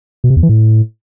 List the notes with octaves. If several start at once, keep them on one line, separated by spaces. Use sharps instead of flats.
B2
C3
E2
E3
A2